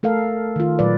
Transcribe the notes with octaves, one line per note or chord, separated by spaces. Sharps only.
A3 A4 A#4 F5
D#3 F4
A#2 F#3 G#3 B4 D5